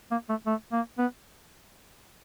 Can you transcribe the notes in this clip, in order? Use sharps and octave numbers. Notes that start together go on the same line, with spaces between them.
A#3
A3
A3
A#3
B3